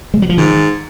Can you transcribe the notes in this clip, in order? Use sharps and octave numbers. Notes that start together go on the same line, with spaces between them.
G#3
F#3
F3
G#2 D#3